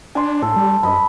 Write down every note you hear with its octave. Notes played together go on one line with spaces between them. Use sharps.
D4 G#5 C6
A2 A4
G3
F#2 D#5 B5